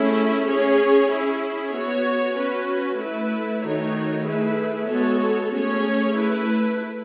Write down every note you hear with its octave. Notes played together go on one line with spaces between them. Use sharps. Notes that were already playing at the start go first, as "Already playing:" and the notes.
Already playing: A3 C#4 E4 G#4
C#4 G#4 C#5
C#4 E4 G#4
B3 F#4 C#5
C#4 F#4 B4
A3 E4 B4
D#3 A3 D#4 F#4 C#5
A3 E4 G#4 B4
G#3 B3 F#4 A4 C#5
A3 C#4 G#4 C#5
A3 E4 B4